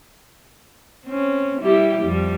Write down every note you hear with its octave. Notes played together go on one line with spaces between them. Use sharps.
C4 C#4
G3 E4 G4
F2 G3